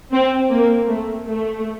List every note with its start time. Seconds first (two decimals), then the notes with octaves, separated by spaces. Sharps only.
0.12 C4
0.50 A#3
0.87 A3
1.26 A3